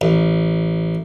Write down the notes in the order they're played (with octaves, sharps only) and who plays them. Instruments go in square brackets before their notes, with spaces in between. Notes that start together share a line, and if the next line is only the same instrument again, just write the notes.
[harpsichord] A1